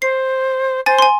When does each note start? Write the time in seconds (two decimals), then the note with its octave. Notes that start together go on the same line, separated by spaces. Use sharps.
0.02 C5 C7
0.86 C5 G#5 A6
0.99 G#5 C6